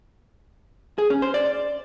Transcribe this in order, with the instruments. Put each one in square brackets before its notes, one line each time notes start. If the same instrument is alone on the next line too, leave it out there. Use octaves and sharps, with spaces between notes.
[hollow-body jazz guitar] G#4
C#4
C5
D5